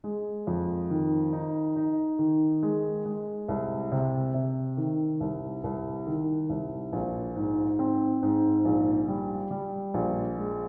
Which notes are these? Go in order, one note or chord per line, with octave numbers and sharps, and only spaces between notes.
G#3
F2
D#3
D#4
D#4
D#3
G#3
G#3
C2
C3
C3
D#3
C2
C2
D#3
C2
A#1
G#2
C4
G#2
A#1
G3
G3
A#1
G#3